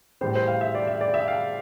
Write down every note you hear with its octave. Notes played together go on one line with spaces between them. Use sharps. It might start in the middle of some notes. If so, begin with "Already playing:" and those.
A2 E3 G3 C5
C5
F5
E5
D5
E5
D5
E5
F5